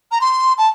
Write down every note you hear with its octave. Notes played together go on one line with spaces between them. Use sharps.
A#5
C6
A5